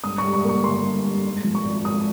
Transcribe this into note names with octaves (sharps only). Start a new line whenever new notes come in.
G2 D#6
C#6
G3
C#6
A#3
C#6
G1 C6
G2
G3
G#2
F3
C#6
G#1
G#1 D#6